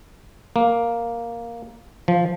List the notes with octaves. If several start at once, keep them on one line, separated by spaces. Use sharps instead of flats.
A#3
F3